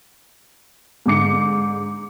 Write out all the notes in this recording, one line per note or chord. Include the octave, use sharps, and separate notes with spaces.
G#2 D3 D6 C#7